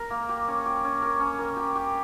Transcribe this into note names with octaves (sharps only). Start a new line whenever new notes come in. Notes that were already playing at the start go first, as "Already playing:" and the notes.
Already playing: A#4
A#3
G4
C#4
G4
C#4
A#4
C#4
A#4
G4
G4